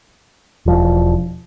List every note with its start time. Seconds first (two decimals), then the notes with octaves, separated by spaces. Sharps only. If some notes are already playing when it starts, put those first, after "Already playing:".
0.66 E1 F3